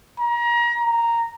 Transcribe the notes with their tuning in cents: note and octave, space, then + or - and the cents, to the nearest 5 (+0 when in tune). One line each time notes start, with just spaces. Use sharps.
A#5 +30
A#5 -5